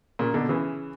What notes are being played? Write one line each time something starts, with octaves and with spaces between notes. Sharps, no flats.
A#2 C#3
B2 D3
C#3 E3